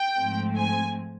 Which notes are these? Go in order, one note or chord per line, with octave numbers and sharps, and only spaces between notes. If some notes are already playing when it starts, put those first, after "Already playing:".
Already playing: G5
G#2 F3 A3 C4
G#5